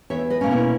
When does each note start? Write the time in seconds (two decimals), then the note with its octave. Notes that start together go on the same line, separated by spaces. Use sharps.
0.10 E2 C#5 E5
0.30 B4 D#5
0.41 B2 A#3 C#4
0.51 E4